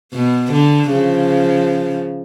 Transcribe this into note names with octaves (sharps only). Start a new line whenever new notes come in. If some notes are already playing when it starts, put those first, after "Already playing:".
B2
D3
C#3 F3